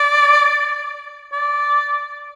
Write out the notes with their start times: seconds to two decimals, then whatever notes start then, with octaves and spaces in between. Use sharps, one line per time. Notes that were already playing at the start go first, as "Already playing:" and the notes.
Already playing: D5
1.33 D5